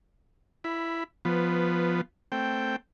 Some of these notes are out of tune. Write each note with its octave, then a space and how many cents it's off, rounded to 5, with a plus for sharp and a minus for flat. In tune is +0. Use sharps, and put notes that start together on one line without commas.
E4 +15 B5 +0
F3 +0 B3 +0 B4 +15
A3 +10 C4 +0 G5 +0